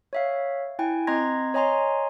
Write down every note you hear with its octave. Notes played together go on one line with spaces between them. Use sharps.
C#5 E5 F5
E4 G5 G#5
C4 D#5 A#5 C6 G#6 A#6
C#5 D#5 G#5 A#5 C6